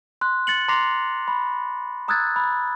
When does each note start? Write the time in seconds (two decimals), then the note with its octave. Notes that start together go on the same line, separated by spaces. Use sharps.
0.21 C6 F#6
0.47 A6 C#7 F#7
0.68 A#5 C6 D6 A#6 C7 F7
1.28 B5
2.08 A#5 D#6 E6 F#6 G#6 A6
2.36 B5